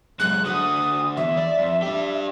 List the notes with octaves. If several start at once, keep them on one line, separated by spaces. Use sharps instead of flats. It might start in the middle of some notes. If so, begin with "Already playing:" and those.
F#2 G#3 F#6
D3 F#4 D#6
E2 E3 E5
D5
F2
D4 G4